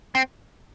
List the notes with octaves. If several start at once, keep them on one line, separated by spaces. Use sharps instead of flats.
C4